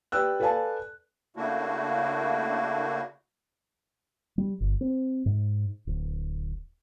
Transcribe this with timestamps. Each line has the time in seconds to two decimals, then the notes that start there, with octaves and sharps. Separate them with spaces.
0.12 G4 B4 D5 G5 E6 F#6
0.40 A4 B4 D5 F5 G#5 A5
1.36 C#3 A3 A#3 D4 E4 F#4
4.38 G3
4.60 G1
4.81 C4
5.26 G#2
5.87 D1